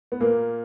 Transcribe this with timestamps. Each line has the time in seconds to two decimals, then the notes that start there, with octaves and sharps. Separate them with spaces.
0.12 B3
0.20 A#2 A#3